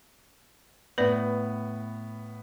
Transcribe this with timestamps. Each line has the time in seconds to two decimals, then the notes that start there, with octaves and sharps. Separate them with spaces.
0.98 A2 B3 B4 D5